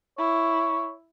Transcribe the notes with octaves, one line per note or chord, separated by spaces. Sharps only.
E4 C#5